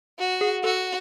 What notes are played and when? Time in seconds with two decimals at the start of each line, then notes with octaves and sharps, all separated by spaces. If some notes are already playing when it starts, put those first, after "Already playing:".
0.19 F#4
0.41 G#4
0.64 F#4 A4